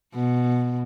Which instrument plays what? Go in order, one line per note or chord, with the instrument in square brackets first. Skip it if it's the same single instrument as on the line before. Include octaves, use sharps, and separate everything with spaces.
[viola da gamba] B2